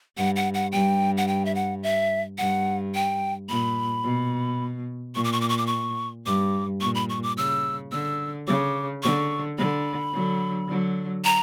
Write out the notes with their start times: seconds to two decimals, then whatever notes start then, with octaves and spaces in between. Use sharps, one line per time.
0.17 G2 F#5
0.36 F#5
0.54 F#5
0.72 G2 G5
1.17 F#5
1.28 G5
1.45 E5
1.55 F#5
1.83 E5
2.38 G2 F#5
2.95 G5
3.49 A#2 B5
4.04 B2
5.15 A#2 C#6
5.24 D6
5.32 C#6
5.41 D6
5.49 C#6
5.58 D6
5.67 C#6
6.26 G2 D6
6.81 A#2 C#6
6.95 B5
7.09 C#6
7.23 D6
7.37 C#3 E6
7.92 D3 E6
8.47 C#3 D6
9.03 D3 C#6
9.58 D3 B5
10.13 D3 F#3
10.69 D3 F#3
11.24 A#5